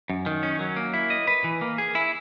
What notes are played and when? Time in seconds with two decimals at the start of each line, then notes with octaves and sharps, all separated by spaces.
0.10 F#2
0.26 D#3
0.43 C#4
0.60 F#3
0.76 A#3
0.94 E4
1.10 D#5
1.27 B4
1.44 E3
1.61 A#3
1.78 G#4
1.95 E4